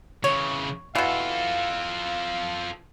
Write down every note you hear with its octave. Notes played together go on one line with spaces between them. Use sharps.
C#3 E3 C#5
B2 E3 F4 A4 F5